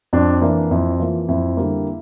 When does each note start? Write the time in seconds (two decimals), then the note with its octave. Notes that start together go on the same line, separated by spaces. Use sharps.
0.13 F2 D4
0.42 E3 A#3 D4
0.71 F2 E4
1.00 E3 A#3 F4
1.28 F2 E4
1.57 D3 G3 A#3